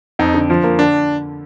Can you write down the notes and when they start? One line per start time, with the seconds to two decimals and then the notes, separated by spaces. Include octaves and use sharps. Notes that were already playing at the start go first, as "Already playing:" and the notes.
0.19 F2 D#4
0.34 D3
0.50 F3
0.64 A#3
0.79 D3 D4